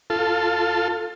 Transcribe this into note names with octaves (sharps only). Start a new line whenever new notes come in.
F4 A4